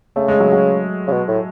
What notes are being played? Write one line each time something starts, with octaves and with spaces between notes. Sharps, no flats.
C#3 A3
G#3
F#3
F#3
C#3
B2
A2